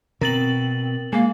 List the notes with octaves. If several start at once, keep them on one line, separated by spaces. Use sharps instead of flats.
B2 C4 A#4 A6 F#7
G#3 A#3